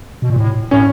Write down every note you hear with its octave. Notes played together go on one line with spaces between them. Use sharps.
B2
A#2
A2
A2 C#4